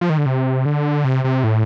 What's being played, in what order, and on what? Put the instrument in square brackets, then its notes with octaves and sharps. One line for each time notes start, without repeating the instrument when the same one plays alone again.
[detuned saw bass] F3
D#3
D3
C3
D3
C3
C3
A2